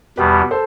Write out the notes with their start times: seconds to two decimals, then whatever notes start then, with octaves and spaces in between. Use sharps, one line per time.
0.17 E2 B2 G3 B3 G4 B4
0.51 A4 C5